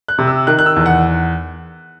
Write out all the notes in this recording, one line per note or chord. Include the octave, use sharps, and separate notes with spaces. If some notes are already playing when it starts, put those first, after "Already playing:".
F#6
C3
E6
D#3 F#6
F#6
E6
E2
F#5